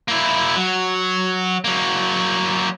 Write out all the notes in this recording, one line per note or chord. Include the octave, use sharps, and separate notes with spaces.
A#3 E4
F#3
F#3 A#3